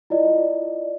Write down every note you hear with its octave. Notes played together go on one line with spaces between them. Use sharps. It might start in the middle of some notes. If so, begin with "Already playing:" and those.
E4 F4 D5 D#5